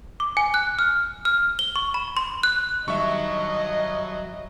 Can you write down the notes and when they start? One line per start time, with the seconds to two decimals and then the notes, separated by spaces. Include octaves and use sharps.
0.20 D6
0.37 G#5
0.54 F#6
0.79 F6
1.25 F6
1.59 G7
1.76 C#6
1.94 B5
2.17 C6
2.43 F#6
2.88 G2 D#3 F#3 D#5 E5 C#6